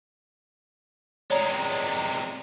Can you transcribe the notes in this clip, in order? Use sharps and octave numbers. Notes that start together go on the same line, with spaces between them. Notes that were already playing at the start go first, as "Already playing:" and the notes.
C3 G#3 C#5 D5 A#5